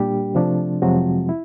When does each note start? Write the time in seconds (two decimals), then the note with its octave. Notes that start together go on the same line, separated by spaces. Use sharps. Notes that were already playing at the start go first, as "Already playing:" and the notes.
Already playing: A#2 G3 A#3 D4 G4
0.35 C3 F3 A3 D4
0.82 F2 C3 F3 F#3 G#3 C4 F#4
1.29 E4